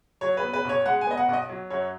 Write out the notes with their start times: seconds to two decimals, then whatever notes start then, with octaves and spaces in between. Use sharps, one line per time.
0.21 F#3 C#5
0.37 B4
0.43 B3
0.53 B4
0.65 B1 C#5
0.86 G#3 F#5
1.01 G#5
1.07 B3 D#5
1.17 F#5
1.28 B1 F#5
1.33 D#5
1.49 F#3
1.70 F#2 C#5